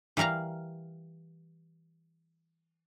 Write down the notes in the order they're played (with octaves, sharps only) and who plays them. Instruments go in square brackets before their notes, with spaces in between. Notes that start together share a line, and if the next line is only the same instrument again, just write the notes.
[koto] E3 G3 A#4 F5 A#5